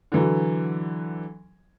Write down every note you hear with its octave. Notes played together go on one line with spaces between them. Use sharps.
D3 E3 F#3